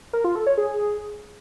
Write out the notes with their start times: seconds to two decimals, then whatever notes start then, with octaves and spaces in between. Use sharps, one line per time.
0.13 A#4
0.24 F4
0.35 A4
0.47 C#5
0.58 G#4